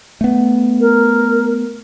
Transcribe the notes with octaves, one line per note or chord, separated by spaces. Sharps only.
A3 B3
A#4